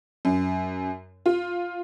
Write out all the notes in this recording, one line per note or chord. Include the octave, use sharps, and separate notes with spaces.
F#2
F4